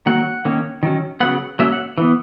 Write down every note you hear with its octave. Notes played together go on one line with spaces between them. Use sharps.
D#3 F#3 A#3 F#5
D#3 A#3 C#4
D#3 F#3 C#4
C#3 F#3 B3 F#5
F#3 A#3 C#4 E5
F#5
E3 B3